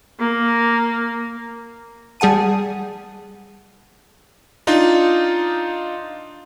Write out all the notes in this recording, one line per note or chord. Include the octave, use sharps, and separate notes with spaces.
A#3
G3 G#4 F#5 A5 D#7
D4 D#4 F4